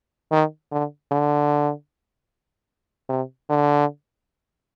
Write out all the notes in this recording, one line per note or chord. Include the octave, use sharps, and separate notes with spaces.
D#3
D3
D3
C3
D3